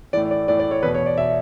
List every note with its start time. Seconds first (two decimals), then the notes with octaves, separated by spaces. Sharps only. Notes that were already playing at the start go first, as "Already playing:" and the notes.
0.13 A2 E3 D5
0.31 D5
0.48 A2 E3 D5
0.59 D5
0.71 C#5
0.83 E2 B2 B4
0.94 C#5
1.06 D5
1.18 B2 E5